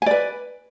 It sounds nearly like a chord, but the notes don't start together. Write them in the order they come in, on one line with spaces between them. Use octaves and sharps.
G#5 D5 B4